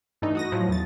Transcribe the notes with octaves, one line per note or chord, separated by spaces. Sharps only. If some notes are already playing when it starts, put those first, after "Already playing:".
G2 E3 A3 D#4
F#4 D#6 A#6
A2 F3 F#3
E2 A6